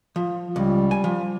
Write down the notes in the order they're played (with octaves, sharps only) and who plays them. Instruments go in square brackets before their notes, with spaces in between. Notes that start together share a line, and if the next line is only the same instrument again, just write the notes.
[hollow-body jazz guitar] F3
[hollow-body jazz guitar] C#2 [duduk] G3
[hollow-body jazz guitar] G#5
F3